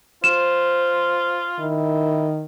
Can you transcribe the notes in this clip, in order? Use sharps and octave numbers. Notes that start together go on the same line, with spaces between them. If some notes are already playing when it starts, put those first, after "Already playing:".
F4 C5 E7
D#3 E4